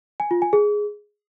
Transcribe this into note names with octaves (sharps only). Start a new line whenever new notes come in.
G#5
F4
G#5
G#4